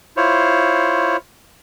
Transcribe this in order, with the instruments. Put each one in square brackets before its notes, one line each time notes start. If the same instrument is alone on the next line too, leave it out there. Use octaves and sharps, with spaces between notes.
[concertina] E4 F4 C5 C#5